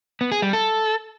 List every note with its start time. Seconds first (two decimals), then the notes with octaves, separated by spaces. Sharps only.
0.21 B3
0.32 G#4
0.42 G3
0.53 A4